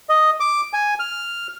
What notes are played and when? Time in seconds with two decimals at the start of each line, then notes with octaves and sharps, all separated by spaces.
0.09 D#5
0.40 D6
0.73 G#5
0.99 F6